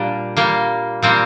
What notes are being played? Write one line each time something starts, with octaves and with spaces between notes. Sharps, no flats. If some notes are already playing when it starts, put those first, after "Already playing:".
Already playing: A#2 G3 A#3 D4
A#2 G3 A#3
A#2 G3 A#3 C4